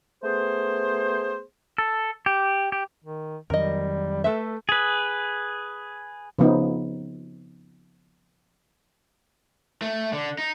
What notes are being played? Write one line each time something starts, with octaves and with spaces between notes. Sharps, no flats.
A3 B3 G#4 C5
A4
G4
G4
D#3
F2 D#3 F#3 G3 A#4 D#5
A3 A4 B4 E5
G#4 B4
C#3 F3 B3 D#4
A3
D3
D#4